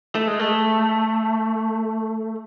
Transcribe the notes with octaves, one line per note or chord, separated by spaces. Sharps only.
A3
G#3
A3